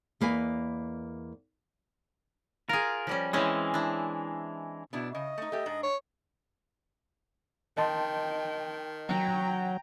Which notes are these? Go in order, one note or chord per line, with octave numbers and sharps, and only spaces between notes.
E2 A#3 B4 D#5 G#5
F4 G#4 A#4
F3 G3 C#4
E3 G#3 C4 C#4 E4
D4 E4
B2 B3 D4 E4
C#3 D#5
A3 D#4
A3 G4
G#2 D4
C#5
D#3 D#5 G5 A5 C6
F#3 G5 A#5